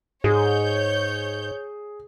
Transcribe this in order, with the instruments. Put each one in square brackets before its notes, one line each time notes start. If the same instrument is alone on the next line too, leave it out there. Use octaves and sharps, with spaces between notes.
[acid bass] G#2 [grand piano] G#4 [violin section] C#5 G6